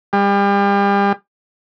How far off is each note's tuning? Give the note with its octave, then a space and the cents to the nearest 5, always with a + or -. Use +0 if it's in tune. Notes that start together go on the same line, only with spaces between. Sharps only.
G3 +35